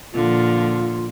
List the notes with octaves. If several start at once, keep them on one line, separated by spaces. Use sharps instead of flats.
A#2 D3 F3 F4